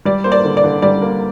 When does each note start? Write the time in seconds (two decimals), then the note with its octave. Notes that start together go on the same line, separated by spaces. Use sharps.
0.05 G3 D5
0.24 A#3 C5
0.32 D5
0.44 D3
0.57 D5
0.64 D3
0.82 G3 D5
1.02 A#3